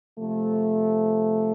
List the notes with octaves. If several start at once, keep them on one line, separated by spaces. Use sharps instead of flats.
C3 F3 A3